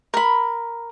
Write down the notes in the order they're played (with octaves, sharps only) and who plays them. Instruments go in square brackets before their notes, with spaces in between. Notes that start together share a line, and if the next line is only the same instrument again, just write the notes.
[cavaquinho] A#4 B5